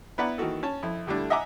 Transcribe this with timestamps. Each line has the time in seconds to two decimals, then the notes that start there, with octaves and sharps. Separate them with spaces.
0.18 B3 E4 B4 D5 F#5 A#5
0.38 D#3 E3 A#3 F#4 A4
0.63 C#4 A5
0.83 F2 E4
1.07 D3 G3 A3 D4 E4
1.30 D#5 E5 F#5 G#5 A#5 D6